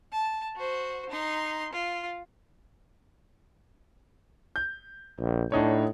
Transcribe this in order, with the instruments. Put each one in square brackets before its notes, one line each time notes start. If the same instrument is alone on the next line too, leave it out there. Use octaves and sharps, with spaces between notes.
[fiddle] A5
F#4 C5
D#4 C6
F4
[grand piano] G6
[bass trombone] A#1
[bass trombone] A2 [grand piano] D4 D#4 C#5